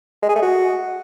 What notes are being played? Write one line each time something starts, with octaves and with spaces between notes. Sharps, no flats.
G#3
G#4
A3
F#4